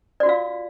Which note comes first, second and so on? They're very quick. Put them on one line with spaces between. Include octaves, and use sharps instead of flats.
D5 F#4 F4 F5